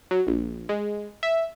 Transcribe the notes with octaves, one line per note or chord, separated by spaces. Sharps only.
F#3
A#1
G#3
E5